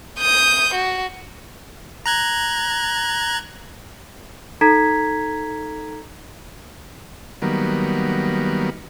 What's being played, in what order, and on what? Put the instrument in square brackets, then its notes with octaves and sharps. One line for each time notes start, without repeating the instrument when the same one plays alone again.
[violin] D#6 G6
F#4
[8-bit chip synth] A#5 F#6 G#6
[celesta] D#4 A4 A#5 G#6 B6
[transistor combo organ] D#3 F#3 G3 A#3 B3